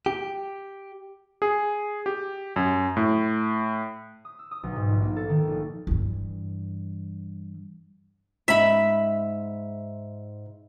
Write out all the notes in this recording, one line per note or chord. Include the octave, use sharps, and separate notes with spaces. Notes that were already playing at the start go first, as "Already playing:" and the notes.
G4
G#4
G4
F#2
A2
D#6
E6
D#6
B1
G#2
A#1
A#3
A4
D#3
A#1
G2 E3
G#2 E5 B5